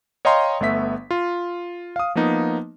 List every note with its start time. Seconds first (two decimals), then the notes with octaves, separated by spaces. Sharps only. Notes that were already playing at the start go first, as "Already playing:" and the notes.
0.25 C#5 D#5 F5 G5 A#5 C6
0.60 G1 A3 B3 E5 B6
1.11 F4
1.96 F5 D#6
2.15 F3 A#3 B3 D#4